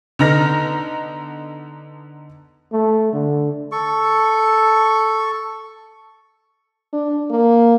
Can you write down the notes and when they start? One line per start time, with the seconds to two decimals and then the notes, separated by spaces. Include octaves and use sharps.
0.19 D3 B3 D#4 A#5 F6 A#6
2.73 A3
3.13 D3
3.72 A4 C#6
6.93 D4
7.30 A#3